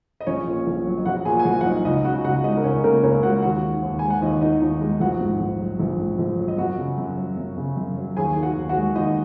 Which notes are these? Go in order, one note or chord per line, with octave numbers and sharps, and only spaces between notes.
D#5
A#1 C#4 C#5
A#2
A#1
F#3
D#5
A#1 F#4 F#5
A#2 G#4 G#5
G#5
A#1 F#4 F#5
F#5
F#3 D#4 D#5
C#2 D#4 D#5
C#3 F#4 F#5
C#2 F#4 F#5
G#3 D#4 D#5
A#4
C#2 C#4 C#5
C#3 A#3 A#4
C#2 C#4 C#5
G#3 F#4 F#5
D#2 F#4 F#5
D#3
D#2
G#3 G#5
F#5
D#2 D#4 D#5
D#3 D#4 D#5
D#2 D#4
G#3 D#4
A#1 F#4 F#5
G#2
A#1
F#3
A#1
G#2
A#1
F#3
D#5
F#2 F#4 F#5
C#3
F#2
F#3
F#2
C#3
F#2
F#3
D#2 G#4 G#5
D#3
F#4 F#5
D#2
F#4 F#5
G#3
D#2 D#4 D#5